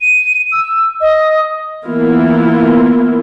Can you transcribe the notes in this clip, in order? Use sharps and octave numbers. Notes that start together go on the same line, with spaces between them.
D#7
E6
D#5
E3 A#3 B3 E4 F4